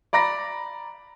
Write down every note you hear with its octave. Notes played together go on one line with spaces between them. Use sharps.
D5 A#5 B5 A#6